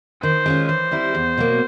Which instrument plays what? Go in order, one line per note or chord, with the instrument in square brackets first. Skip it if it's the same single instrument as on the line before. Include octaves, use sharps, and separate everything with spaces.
[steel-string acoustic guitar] D#3 [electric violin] C5
[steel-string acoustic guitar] G#3 C#4 F4
[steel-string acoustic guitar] E3 [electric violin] C5
[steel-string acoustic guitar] G3 C4 E4
E2
B2 F#3 A#3